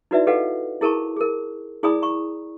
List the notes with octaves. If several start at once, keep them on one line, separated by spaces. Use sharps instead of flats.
D#4 E4 F#4 B4 D5 E5
G4 A4 B4 D#5 F5 F#5
E4 G#4 A#4 A5 A#5 C#6
G#4 A#4
E4 G#4 D5 G#5 B5 D#6
A#5 C#6